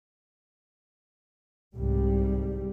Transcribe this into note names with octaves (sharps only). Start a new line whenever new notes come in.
C2 G#2 G3